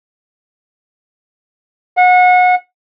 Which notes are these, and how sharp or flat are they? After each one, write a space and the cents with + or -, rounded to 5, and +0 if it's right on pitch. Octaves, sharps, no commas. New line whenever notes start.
F#5 -30